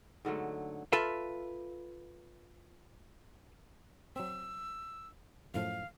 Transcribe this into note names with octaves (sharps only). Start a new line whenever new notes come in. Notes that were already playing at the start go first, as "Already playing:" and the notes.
G#2 D3 F#3 A3
F4 A4 B4 E5 F5
F#3 C4 E6
F#2 A2 F3 F5